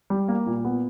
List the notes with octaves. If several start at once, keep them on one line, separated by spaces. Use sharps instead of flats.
G3
A#3
A#2
B3